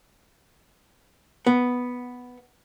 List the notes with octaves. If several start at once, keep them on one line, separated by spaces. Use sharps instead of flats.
B3